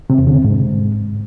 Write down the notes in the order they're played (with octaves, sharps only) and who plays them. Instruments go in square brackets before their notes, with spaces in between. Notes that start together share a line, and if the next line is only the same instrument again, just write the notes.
[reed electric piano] C3
E2
D3
C3
G#2